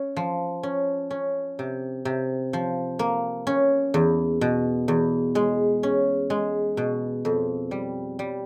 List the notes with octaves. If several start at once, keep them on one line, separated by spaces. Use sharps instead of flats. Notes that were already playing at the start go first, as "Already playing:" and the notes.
Already playing: C#4
F3
C#4
C#4
C3
C3
F3
A#3
C#4
E2
B2
E2
G#3
C#4
G#3
B2
F2
G3
G3